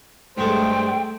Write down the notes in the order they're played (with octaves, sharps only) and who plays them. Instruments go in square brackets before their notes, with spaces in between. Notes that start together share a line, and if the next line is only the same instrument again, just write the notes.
[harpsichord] G2 G#3 A4 [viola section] A3 G#4 [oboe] C5 [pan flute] G5